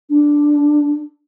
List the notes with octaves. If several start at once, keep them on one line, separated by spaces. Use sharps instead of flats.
D4